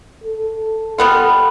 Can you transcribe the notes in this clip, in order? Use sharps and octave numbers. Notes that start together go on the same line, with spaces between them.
A4
G3 B3 F4